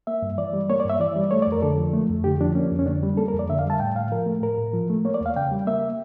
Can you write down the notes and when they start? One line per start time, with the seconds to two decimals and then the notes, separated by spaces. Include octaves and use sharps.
0.07 A#3 E5
0.22 G2
0.38 E3 D5
0.53 G3
0.70 A#3 C#5
0.80 D5
0.85 G2 E5
1.00 E3 D5
1.16 G3
1.31 A3 C#5
1.42 D5
1.47 F2
1.52 A#4
1.62 D3 A4
1.78 F3
1.93 A3
2.10 F2
2.24 D3 G4
2.40 F3 D4
2.55 A#3 C#4
2.71 F2
2.79 C#4
2.86 D3 D4
3.03 G3
3.17 A#3 A4
3.28 A#4
3.34 F2
3.39 D5
3.50 D3 E5
3.59 F5
3.65 G3 A5
3.80 A2 G5
3.95 A2 F5
4.12 F3 A#4
4.26 A3
4.42 A2 A#4
4.58 A2
4.73 F3
4.90 A3
5.05 A#3 C#5
5.14 D5
5.21 E2 F5
5.36 C#3 G5
5.52 G3
5.67 A#3 E5